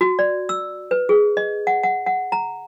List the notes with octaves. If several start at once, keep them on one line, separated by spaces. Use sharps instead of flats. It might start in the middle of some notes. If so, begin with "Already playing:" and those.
F#4
D5
E6
B4
G#4
D#5
F#5
F#5
F#5
A#5